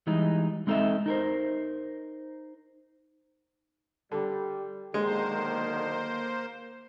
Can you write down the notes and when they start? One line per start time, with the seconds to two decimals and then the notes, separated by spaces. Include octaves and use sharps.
0.07 E3 G3 G#3 D#4
0.67 G#3 C4 D#4 A4 C5 E5
1.06 D#4 A#4 C5
4.12 D3 G3
4.94 B1 D3 D#3 G#3 A#3 C5